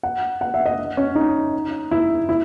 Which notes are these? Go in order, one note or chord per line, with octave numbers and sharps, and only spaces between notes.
F#5
F#5
E5
D#5
C#4
D#4
E4
E4